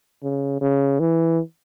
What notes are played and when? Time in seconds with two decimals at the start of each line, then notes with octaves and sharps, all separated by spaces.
0.23 C#3
0.61 C#3
1.00 E3